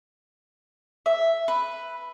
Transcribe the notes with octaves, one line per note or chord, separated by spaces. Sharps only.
E5
B4